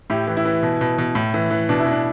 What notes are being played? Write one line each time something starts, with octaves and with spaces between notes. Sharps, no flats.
A2 E4 G4
E3
E4
E3
B2
B2
B2
A2
E3
E3
B2 D4
E4
B2
D4